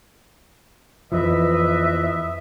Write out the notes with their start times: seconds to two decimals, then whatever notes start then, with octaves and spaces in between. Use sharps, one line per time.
1.12 F2 E3 F3 B4 D#5 E5